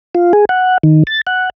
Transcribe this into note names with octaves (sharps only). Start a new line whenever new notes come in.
F4
G#4
F#5
D#3
A6
F#5